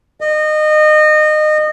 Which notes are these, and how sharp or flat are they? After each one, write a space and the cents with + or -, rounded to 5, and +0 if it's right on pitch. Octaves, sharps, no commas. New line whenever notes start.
D#5 -25